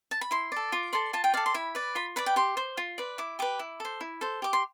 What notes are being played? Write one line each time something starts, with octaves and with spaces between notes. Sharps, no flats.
A5
B5
E4 C6
A4 D5
F4 D6
A4 D5 C6
F4 A5
G5
A4 D5 F5
C6
E4 B5
B4 D5
F4 B5
B4 D5 B5
G5
G4 C6
C5
F4
B4 D5
E4 D6
G4 B4 D6
E4
A4 C5
E4
A4 C5
G4 D6
C6